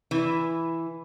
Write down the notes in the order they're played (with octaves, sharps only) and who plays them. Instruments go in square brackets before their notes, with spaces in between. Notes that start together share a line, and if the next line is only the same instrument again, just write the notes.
[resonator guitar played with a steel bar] E3